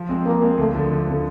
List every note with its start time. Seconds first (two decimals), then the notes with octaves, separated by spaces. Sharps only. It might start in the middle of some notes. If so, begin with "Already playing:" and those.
Already playing: F3
0.09 G#3 C4
0.25 F3 A#3
0.42 G#3 C4
0.58 D2 A3
0.74 D3 F3
0.90 D2
1.07 D3 F3